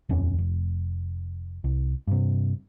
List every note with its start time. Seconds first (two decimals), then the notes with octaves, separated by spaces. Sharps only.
0.09 D#1 F2 C#4
0.38 F1
1.64 C2
2.07 G2 C3